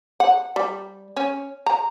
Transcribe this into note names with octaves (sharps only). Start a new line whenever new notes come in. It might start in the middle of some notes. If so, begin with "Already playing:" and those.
F#5
G3
C#4
A#5